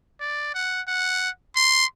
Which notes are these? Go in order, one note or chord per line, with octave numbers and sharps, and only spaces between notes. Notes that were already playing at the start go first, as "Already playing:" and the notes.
D5
F#5
F#5
C6